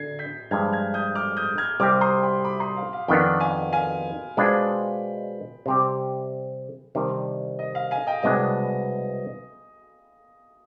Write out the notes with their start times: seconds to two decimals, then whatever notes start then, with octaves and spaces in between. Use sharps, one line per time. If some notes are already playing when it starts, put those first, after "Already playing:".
Already playing: D3 G#6 C7
0.19 G6 B6
0.51 G2 F3 G#3 D4 F6 G#6
0.73 F6 G#6
0.94 D#6 G6
1.15 D6 F6
1.37 D#6 G6
1.58 F6 G#6
1.80 C2 C3 G3 C4 G4 D6 F6
2.01 C6 D#6
2.23 G5 B5
2.44 B5 D6
2.60 C6 D#6
2.77 F5
2.93 F5
3.08 F2 D#3 B3 D4 G5 B5
3.40 F5 G#5
3.73 F5 G#5
4.37 B2 G#3 D4 F4 C5 G5 B5
5.66 C3 G3 C4 G4
6.95 C3 D#3 G3 D4
7.59 D#5
7.75 F5
7.91 F5 G#5
8.07 D#5 G5
8.23 C2 B2 G#3 B3 D4 D#5